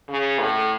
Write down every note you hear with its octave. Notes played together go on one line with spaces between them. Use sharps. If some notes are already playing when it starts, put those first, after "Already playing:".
C#3
A2